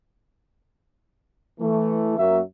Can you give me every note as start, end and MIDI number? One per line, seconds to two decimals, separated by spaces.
1.60 2.14 52
1.60 2.14 57
2.18 2.41 42
2.18 2.41 54
2.18 2.41 58
2.18 2.42 76